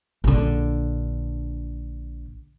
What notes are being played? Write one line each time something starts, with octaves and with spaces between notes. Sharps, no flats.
A#1 D3